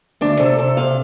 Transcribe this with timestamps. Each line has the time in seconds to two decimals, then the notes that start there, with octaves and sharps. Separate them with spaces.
0.21 D2 D4
0.39 C3 A4
0.58 C3 A4
0.77 C3 F5